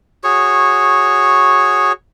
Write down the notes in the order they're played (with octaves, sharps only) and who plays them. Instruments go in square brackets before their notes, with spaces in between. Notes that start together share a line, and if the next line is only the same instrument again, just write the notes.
[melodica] F#4 G#4 C#5 C#6